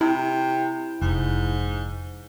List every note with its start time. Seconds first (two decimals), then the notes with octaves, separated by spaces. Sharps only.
0.01 C3 E4
1.01 F1 G#2